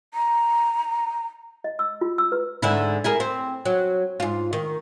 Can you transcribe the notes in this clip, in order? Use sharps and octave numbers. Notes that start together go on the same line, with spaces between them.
A#5
D#5
E6
F4
E6
B4
G#2 D3 E4
E4 G#4 A#4
C4
F#3
G#2 F4
D#3